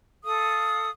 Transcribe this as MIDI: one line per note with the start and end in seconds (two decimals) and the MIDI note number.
0.23 0.90 69
0.23 0.90 77
0.23 0.90 87